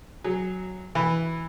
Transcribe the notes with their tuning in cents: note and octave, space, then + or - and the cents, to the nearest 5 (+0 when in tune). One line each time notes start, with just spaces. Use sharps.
F#3 +0 G#4 +0
E3 +0 B4 +0